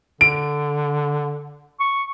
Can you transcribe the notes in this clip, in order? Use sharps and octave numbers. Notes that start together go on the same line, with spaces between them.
D3 D7
C#6